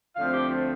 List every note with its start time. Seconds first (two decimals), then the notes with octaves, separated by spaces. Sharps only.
0.16 D2 D3 F3 A3 C4 F5
0.34 G4
0.51 F4